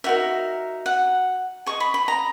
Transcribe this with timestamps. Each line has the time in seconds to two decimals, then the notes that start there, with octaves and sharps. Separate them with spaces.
0.04 D#4 F#4 A#4 E5
0.86 F#5
1.66 G#4 D#5 C#6
1.80 B5
1.94 B5
2.08 A#5